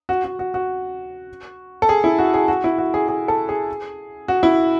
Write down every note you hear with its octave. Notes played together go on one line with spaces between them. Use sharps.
F#4
F#4
F#4
F#4
A4
G#4
E4
F#4
G#4
F#4
E4
F#4
G#4
G#4
A4
G#4
F#4
E4